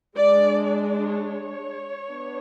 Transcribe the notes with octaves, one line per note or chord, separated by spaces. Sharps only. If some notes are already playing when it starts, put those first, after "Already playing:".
G#3 D4 D5
D5
C#5
B3 D4